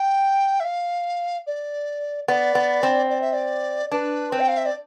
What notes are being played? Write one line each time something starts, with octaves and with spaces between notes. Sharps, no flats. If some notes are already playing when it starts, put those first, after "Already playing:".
Already playing: G5
E5
F5
D5
B3 D5
B3
C4
D5
E5
D5
D4 B4
C4
G5
F5
E5
D5